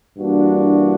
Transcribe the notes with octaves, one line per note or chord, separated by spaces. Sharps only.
G2 E3 A#3 D4 F#4